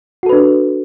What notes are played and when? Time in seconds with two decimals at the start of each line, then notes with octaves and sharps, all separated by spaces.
0.23 F#4
0.26 A4
0.29 B4
0.33 D4